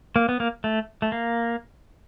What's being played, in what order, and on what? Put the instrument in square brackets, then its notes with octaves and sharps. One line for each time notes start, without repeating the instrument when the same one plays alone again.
[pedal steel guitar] A#3
B3
A#3
A3
A3
A#3